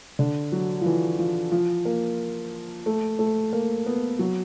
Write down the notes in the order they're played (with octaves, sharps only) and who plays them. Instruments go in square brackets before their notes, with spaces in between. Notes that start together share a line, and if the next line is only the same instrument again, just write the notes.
[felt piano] D3
F#3
F3
E3
F3
F3
A#3
A3
A3
A#3
B3
F#3